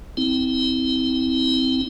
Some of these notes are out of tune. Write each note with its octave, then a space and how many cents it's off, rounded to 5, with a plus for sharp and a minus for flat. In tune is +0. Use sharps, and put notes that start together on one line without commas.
C4 -15 E4 -35